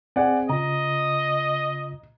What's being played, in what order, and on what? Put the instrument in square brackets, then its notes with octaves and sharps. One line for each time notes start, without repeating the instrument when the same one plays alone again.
[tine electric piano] C4 G#4 [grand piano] D5 F#5 G#5
[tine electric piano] C#3 F4 [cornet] D#5 [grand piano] A#5